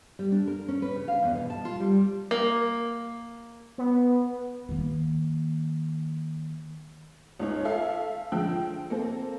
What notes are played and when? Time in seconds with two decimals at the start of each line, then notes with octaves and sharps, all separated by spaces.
0.19 G3
0.32 D4
0.47 A#4
0.68 C#4
0.82 B4
0.96 C#3
1.08 F5
1.23 E2
1.35 B2
1.50 A5
1.65 F4
1.80 G3
2.31 A#3
3.78 B3
4.69 D#3 A#3
7.39 C#2 D#4 C#5
7.65 A4 E5 F5
8.32 D3 F3 G#3 G5 E6
8.90 A#3 C4 A4